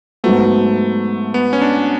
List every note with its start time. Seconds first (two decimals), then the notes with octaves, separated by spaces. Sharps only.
0.24 G#2 F#3 A3 B3
1.34 B3
1.53 C#4
1.62 D4